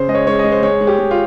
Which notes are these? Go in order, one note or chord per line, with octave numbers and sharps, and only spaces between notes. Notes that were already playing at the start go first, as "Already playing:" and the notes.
Already playing: C#3 C5
G#3 D#5
C#5
G#3 C#5
D#5
G#3
C5
G#3 C#5
G#3
G4
G#3
F4